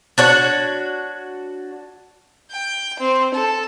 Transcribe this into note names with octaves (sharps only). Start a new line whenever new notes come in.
D4 F#4 C#5
G5
C4
A4